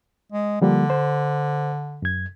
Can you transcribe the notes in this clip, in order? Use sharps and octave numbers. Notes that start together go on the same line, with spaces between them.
G#3
D3 F3 G3 A#3
C5
F#2 G#6